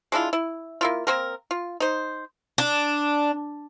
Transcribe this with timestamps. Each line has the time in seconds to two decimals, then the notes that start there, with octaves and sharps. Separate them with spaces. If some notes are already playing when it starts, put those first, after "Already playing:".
0.12 G#3 D4 E4 F4
0.33 E4
0.81 A#3 E4 F4
1.07 A#3 C4 A#4
1.51 F4
1.80 D#4 C5
2.58 D4